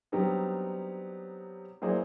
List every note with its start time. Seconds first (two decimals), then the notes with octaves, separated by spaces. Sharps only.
0.12 F#3 G3 B3 C4 D4 D#4
1.82 F#3 A#3 E4 G#4 C5 D5